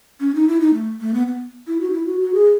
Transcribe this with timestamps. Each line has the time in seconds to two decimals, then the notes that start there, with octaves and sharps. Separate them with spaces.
0.21 C#4
0.35 D#4
0.48 E4
0.61 D#4
0.74 A3
1.01 A3
1.14 B3
1.27 B3
1.68 E4
1.81 F#4
1.90 D#4
1.93 E4
2.07 F#4
2.20 F#4
2.34 G#4